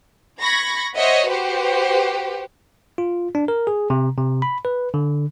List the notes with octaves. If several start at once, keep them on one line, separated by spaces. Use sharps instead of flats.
B5 C#6 G#6 A#6
C5 C#5 D#5 E5 F#5
F#4 G4 B4 C5
F4
D4
A#4
G#4
C3
C3
B5
B4
D3